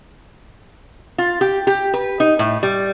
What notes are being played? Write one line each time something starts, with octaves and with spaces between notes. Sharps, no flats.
F4
G4
G4
B4
D#4
A2
G3